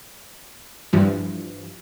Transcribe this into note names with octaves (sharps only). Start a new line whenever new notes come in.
G2 E3 F3